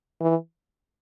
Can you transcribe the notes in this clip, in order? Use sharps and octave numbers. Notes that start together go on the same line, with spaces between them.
E3